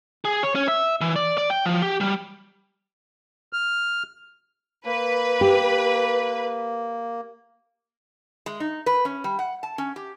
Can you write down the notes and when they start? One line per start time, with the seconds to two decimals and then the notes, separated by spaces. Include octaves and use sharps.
0.25 G#4
0.43 C#5
0.55 C#4
0.68 E5
1.01 E3
1.16 D5
1.38 D5
1.50 G5
1.65 F3
1.82 G4
2.01 G3
3.53 F6
4.86 A#3 B4
5.41 G4
8.46 G#3
8.60 D#4
8.86 B4
9.05 C#4
9.24 G3
9.39 F#5
9.63 A5
9.78 C#4
9.96 G4